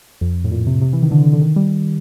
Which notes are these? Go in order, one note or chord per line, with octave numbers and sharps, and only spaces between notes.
F2
A2
A#2
C3
C3
E3
D#3
D3
D3
D#3
G3